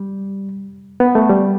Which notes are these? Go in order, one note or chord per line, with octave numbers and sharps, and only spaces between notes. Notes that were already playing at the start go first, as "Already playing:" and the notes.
Already playing: G3
B3
A3
G3